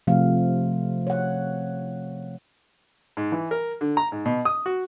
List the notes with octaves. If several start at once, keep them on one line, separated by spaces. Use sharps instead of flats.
C3 F3 A3 F5
C#5 F#5
G#2
E3
A#4
D3
A#5
G#2
B2
D#6
F#4